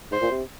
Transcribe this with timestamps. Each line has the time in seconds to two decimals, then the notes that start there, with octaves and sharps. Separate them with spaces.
0.11 G#2 C5
0.21 A#2
0.31 C3